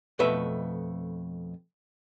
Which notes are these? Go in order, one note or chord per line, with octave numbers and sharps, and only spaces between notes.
F2 B2 A3 B4 E5